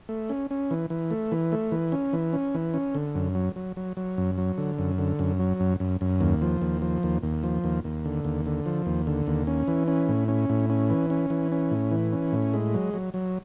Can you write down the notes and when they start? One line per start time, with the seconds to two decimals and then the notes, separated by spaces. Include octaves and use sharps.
0.09 A3
0.30 C#4
0.51 C#4
0.71 E3
0.90 E3
1.11 A3
1.32 E3
1.52 A3
1.72 E3
1.92 C#4
2.13 E3
2.33 C#4
2.54 E3
2.74 C#4
2.95 D3
3.15 F#2
3.35 F#3
3.56 F#3
3.77 F#3
3.97 F#3
4.18 F#2
4.38 F#3
4.58 D3
4.79 F#2
4.98 D3
5.19 F#2
5.40 F#3
5.60 F#2
5.80 F#2
6.01 F#2
6.21 D#2
6.42 F3
6.62 D#2
6.82 F3
7.03 D#2
7.23 D#2
7.43 F3
7.64 D#2
7.84 D#2
8.05 D3
8.25 D#2
8.46 D3
8.66 F3
8.86 D#2
9.07 D3
9.27 D#2
9.47 C#4
9.68 E3
9.88 C#4
10.09 A2
10.28 C#4
10.50 A2
10.70 C#4
10.90 E3
11.10 C#4
11.30 E3
11.52 C#4
11.71 A2
11.91 E3
12.13 C#4
12.32 A2
12.54 G#3
12.74 F#3
12.94 F#3
13.14 F#3